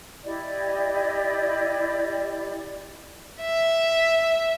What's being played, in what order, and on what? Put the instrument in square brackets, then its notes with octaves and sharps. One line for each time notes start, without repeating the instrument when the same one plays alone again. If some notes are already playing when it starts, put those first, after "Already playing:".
[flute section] E4 G4 D5 D#5
[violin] E5